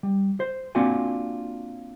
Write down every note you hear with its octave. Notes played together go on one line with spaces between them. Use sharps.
G3
C5
A#3 C4 D4 F4 F#4 G#5